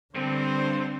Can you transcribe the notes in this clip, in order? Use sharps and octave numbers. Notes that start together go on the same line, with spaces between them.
G2 D3 C4 C5